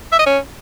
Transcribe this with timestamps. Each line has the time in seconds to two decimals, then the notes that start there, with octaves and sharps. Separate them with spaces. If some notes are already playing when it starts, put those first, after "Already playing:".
0.12 E5
0.19 D#5
0.26 C#4